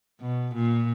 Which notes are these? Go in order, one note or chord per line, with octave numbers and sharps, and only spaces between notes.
B2
A#2